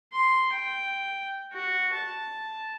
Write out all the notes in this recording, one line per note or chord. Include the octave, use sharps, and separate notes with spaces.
C6
G5
F#4
A5